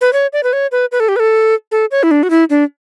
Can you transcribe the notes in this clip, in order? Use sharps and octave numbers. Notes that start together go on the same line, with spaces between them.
B4
C#5
D5
B4
C#5
B4
B4
A4
G4
B4
A4
A4
C#5
E4
D4
F#4
E4
D4